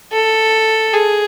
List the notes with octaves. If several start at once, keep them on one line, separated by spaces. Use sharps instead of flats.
A4
G#4